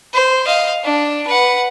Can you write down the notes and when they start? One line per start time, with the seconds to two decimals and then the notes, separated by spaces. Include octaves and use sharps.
0.14 C5
0.46 D#5 F5
0.84 D4
1.27 B4 F#5